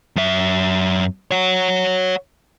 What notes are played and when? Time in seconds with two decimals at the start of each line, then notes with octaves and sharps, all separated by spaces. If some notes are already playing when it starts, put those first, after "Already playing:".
0.16 F#2 E5
1.31 C#5 F#5